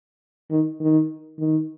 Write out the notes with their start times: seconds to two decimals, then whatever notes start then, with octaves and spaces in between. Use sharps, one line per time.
0.51 D#3
0.80 D#3
1.39 D#3